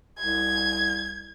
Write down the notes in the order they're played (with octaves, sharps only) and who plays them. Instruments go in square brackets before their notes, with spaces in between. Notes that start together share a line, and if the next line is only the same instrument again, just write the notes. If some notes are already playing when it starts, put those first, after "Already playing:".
[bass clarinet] C2 [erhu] G#6